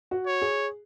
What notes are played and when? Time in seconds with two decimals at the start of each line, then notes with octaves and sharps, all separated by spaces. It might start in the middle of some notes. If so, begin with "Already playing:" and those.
0.11 F#4
0.27 C#5
0.42 G#4